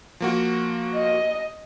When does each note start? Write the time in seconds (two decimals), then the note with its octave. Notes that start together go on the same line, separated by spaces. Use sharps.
0.20 F3 A#3 F#4
0.95 D#5